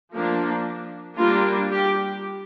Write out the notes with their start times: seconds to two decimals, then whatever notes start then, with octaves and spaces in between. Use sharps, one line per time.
0.14 F3 A#3 D4
1.18 G3 A#3 D4 F4
1.71 G4